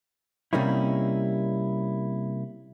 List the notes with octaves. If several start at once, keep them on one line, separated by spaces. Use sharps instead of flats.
C3 G3 A#3 C#4 D#4 E4